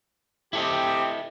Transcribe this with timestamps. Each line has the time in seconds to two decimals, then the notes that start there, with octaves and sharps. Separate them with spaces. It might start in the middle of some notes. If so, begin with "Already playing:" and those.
0.53 C4 E4 G4 A4 D#5